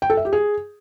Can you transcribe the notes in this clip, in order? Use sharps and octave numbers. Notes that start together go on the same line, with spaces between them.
G5
A4
E5
G4
G#4